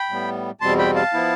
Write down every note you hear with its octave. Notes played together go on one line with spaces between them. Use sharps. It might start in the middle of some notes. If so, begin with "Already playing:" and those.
Already playing: G5 B5
A2 G3 B3
E2 B2 G3 C4 A5 C6
G5 B5
F5 A5
F3 B3 E4